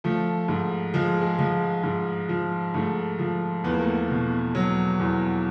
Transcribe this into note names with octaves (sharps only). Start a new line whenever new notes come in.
F3 A3
G#2
F3 G#3
G#3
F3 G#3
G#2
F3
G#2 A3
F3
E2 B3
A#3
A3
A#3
B2
F#3
E2